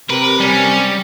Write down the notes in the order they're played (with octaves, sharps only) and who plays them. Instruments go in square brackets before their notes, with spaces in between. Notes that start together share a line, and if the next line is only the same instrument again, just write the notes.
[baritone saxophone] C3 [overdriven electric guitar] A#4 [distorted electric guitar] B4
[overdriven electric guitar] G3 [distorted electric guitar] C#4